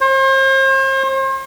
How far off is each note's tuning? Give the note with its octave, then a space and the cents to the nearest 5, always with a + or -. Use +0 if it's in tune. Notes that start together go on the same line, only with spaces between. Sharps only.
C5 +40